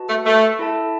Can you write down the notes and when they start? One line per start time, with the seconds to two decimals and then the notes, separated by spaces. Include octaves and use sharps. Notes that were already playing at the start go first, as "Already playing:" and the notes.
Already playing: F#4 B4 D#5 A5
0.09 A3
0.26 A3
0.59 E4 A4 E5 A5